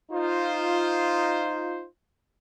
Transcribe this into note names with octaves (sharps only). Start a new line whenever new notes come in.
D#4 F4 C5